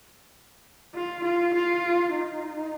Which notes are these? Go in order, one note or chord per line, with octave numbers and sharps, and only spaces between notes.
F4
F4
F4
D#4